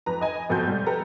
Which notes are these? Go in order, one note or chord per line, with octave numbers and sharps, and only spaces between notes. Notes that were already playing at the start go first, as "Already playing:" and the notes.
F2 B4 A#5
D#5 G#5
F2 B2 C4 A4 G6
G3
G4 A4 B4 A#5